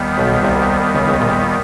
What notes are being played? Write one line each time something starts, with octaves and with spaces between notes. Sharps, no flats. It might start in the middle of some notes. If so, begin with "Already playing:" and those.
Already playing: D#2 D#3 G3 B3
B1 B2
C2 C3
C#2 C#3
C#2 C#3
A#1 A#2